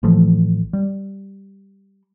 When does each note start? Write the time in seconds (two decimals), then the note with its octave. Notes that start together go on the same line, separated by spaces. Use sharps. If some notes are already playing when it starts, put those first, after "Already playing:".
0.03 A1 E3 F3 A3
0.73 G3